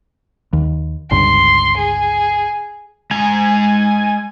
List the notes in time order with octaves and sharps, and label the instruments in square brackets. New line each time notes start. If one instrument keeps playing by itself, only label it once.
[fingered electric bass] D#2
[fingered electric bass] G1 C#2 [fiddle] C6
[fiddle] G#4
[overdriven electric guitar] G#3 A#5 [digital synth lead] G#5